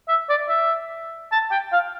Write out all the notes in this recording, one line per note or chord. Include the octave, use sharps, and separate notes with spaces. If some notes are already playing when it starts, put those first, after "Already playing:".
E5
D5
E5
A5
G5
F5